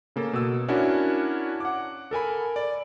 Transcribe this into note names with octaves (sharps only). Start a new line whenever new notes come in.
C#3 A#3 A4
B2 E6
C#4 D4 E4 F#4 A#4
F#5 D6
A4 A#4 G#5 B5
D5